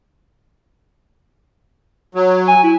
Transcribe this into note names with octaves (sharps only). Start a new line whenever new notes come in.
F#3
G#5
E4